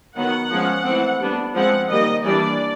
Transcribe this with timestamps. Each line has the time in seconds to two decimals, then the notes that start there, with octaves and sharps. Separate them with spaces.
0.16 D#3 F#3 B3 F#5
0.51 F3 G#3 C#4
0.85 E3 A3 C4
1.20 G3 B3 D4
1.55 F3 G#3 C4 F#5
1.89 D#3 G3 A#3 D#5
2.24 E3 G3 A#3 D4 D5